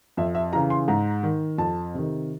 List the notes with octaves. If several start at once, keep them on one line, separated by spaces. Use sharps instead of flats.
F2 E5
E5
C#3 E3 A#5
C6
G#2 A#5
D#3
F2 A5
C3 D#3